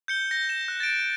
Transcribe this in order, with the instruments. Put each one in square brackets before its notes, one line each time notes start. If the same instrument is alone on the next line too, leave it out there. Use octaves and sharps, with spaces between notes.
[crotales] G6 C#7 G7
G6 A#6
E7
F#6
A6 D7